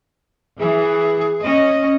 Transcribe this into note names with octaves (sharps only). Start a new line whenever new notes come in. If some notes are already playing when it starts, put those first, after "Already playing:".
E3 G#4
C#4 D#5